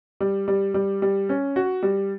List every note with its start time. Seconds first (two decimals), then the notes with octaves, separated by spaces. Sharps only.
0.20 G3
0.48 G3
0.74 G3
1.02 G3
1.29 C#4
1.56 F#4
1.83 G3